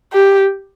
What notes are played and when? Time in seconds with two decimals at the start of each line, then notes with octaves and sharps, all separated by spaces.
0.13 G4